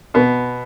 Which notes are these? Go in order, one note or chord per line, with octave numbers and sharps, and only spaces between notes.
B2 B3